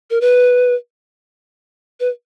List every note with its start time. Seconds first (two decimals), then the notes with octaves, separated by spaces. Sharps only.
0.10 A#4
0.21 B4
2.00 B4